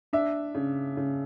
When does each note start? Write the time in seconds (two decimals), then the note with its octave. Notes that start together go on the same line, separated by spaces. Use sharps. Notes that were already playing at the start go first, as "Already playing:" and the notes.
0.13 D4 E5
0.55 C#3
0.97 C#3